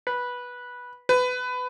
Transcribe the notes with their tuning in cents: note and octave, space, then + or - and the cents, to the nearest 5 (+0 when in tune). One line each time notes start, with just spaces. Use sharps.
B4 -10
B4 +20